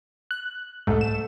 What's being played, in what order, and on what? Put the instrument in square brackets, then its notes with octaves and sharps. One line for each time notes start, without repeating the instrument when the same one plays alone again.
[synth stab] F#6
[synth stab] C2 G#2 [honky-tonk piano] A3 A4
[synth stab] E7